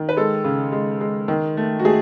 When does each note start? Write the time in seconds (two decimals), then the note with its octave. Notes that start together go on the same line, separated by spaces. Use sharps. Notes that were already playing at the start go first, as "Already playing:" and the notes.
Already playing: D#3
0.09 B4
0.17 G#3 A4
0.44 C#3
0.72 G#3
1.01 G#3
1.28 D#3
1.57 A3
1.79 F#4
1.84 A3 G#4